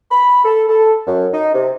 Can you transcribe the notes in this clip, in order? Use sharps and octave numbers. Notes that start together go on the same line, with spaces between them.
B5
A4
A4
F#2
D#4
C3